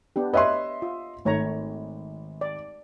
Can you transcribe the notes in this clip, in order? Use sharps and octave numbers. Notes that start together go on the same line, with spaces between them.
B3 D4 G4
B4 C#5 D#5 E5 C6
F4
G#1 A3 C#5 A#5
D5